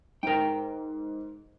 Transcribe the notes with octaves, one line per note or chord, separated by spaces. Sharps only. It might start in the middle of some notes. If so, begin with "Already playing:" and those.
G#2 A#4 G5